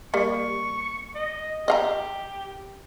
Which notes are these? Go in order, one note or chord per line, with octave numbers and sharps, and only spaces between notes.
G3 A#3 C#6
D#5
G4 D#5 F5 A#5